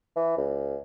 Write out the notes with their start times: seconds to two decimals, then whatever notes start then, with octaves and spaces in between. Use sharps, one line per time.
0.16 E3
0.37 C#2